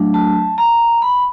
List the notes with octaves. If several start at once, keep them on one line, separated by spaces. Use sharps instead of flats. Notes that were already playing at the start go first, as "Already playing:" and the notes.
Already playing: F#3 A3 D4
A5
A#5
B5